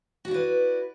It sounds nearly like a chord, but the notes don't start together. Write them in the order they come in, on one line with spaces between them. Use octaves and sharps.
F#4 D5 E4 B4